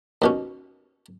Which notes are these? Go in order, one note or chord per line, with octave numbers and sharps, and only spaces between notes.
D#2 B2 C#4